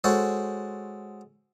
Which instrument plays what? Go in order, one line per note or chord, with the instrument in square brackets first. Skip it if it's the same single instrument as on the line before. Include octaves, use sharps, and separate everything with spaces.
[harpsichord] G#3 F#4 A4 C5 C#5